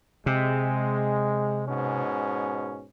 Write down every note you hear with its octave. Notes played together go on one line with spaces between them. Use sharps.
C3 G#3
G#2 B2 C#4